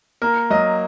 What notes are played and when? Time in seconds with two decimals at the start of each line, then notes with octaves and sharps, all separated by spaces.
0.22 A#3 A#4
0.50 F#3 D#5